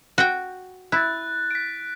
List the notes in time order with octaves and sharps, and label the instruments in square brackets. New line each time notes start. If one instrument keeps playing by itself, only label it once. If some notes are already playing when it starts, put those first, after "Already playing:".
[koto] F#4 G5
[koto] E4 [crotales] F#6 A6
[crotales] B6 D7